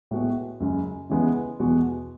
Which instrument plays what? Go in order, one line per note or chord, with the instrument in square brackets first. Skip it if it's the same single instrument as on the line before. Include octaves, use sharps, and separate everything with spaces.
[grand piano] A2 G#3 B3 F#4
F#2 C#3 G#3
C#3 E3 G#3 B3
E2 B2 G#3 B3 F#4